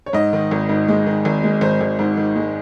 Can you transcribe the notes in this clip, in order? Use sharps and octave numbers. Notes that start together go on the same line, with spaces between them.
C#5
G#2 D#5
D#3
G#1
G#2
G#3
D#3
G#1
G#3
G#1 C5
G#1
G#2
D#3
G#3